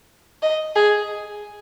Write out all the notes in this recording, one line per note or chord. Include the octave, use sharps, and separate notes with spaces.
D#5
G#4